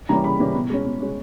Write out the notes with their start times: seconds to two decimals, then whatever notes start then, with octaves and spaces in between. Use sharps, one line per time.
0.09 E3 G3 A#3 C#4 A#5
0.24 C#3 B5
0.40 E3 G3 A#3 C#4
0.55 B2
0.70 G#3 C#4
0.86 B2
1.01 G#3 C#4